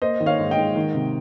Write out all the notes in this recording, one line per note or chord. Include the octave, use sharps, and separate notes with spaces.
A#3 C5 D#5
D#3
C#5 F5
G#2
D#5 G5
G#2
D#3
C3